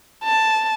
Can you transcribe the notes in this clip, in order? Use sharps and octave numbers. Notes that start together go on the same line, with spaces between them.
A5